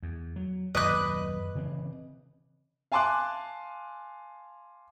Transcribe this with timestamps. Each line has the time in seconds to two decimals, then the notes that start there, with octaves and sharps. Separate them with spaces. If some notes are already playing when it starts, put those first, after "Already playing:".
0.03 E2
0.36 F#3
0.75 D#1 F#2 B4 D#5 D6 F#6
1.55 C#3 E3 C4
2.92 F5 G#5 A5 C6 D6 F#6